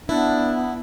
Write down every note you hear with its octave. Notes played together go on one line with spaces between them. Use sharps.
B3 D4 E4